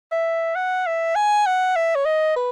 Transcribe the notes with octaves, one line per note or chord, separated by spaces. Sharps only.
E5
F#5
E5
G#5
F#5
E5
C#5
D#5
B4